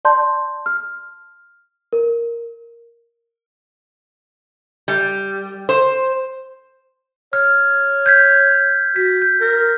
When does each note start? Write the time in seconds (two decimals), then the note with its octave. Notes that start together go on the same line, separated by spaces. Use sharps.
0.05 D5 A5 C6 G6
0.66 F6
1.93 A#4
4.88 G3
5.69 C5
7.33 C#5 F6
8.06 G6 G#6 B6
8.96 F#4 B6
9.22 G6
9.41 A#4